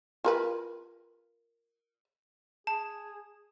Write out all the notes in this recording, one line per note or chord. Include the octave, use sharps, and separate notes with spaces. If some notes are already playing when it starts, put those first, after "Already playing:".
F4 A#4 B4
G#4 A5